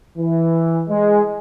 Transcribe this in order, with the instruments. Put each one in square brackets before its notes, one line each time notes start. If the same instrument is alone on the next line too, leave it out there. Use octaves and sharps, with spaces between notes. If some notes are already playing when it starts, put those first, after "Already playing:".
[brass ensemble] E3
G#3